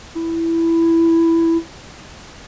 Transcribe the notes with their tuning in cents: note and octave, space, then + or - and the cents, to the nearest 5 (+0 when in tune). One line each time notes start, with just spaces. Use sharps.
E4 +5